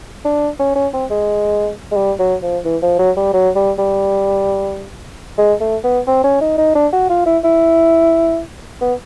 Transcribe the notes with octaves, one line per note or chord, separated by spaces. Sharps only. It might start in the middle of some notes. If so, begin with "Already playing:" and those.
D4
C#4
C#4
C4
G#3
G#3
G3
F#3
F3
E3
F3
F#3
G3
F#3
G3
G3
G#3
A3
B3
C4
C#4
D#4
D#4
D4
F#4
F4
E4
E4
B3